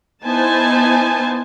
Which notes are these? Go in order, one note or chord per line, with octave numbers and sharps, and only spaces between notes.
B3 D#4 E4 C5 G#5 A5